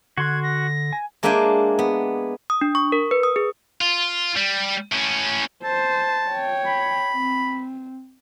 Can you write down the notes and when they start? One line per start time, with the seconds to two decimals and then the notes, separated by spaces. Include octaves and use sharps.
0.18 D3 F#4 C6 F#6 G#6
0.43 A#6
0.93 G#5
1.23 G#3 A#3 D4 E5 G5 G#5
1.79 B3
2.50 D#6
2.61 D4
2.75 C#6
2.92 A#4
3.11 B4
3.23 D#6
3.36 G#4
3.81 F4
4.37 G3
4.92 A2 C#4
5.64 C5 A5
6.29 C#5 G5
6.67 B5
7.14 C4